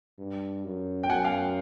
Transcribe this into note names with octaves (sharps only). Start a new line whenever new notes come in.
G2
F#2
G5
F#2 F#5 G#5
F5 G5